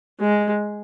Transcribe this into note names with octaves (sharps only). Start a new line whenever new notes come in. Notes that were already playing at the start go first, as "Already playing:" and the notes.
G#3